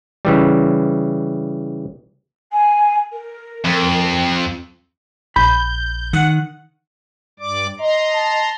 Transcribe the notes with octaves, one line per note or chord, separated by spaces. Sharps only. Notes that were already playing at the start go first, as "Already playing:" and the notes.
C#3 E3 G3
G#5
A#4
F2
A#1 B5 G6
D#3 F#5
G2 D5 D6
D#5 A#5 C6
A5